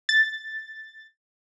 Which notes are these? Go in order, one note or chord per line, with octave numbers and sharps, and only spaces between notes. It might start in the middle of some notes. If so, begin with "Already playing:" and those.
A6